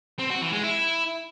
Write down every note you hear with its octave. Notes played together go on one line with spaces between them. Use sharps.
C4
F#4
E3
G#3
E4